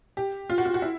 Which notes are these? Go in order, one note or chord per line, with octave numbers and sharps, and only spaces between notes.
G4
F4
F#4
F4
F#4
E4